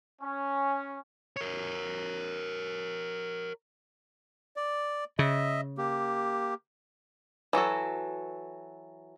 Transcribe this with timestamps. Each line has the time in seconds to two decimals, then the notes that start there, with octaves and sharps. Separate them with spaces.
0.21 C#4
1.37 A#4 C#5
4.56 D5
5.19 C#3 D#5 E5
5.78 A#3 G4
7.53 E3 F#3 F#4 A4